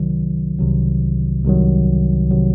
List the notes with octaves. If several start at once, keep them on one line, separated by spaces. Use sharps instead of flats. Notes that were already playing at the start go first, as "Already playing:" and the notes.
Already playing: C2 C3 D#3 F#3
C2 C3 D#3 F#3
C2 C3 D#3 F#3
C3 D#3 F#3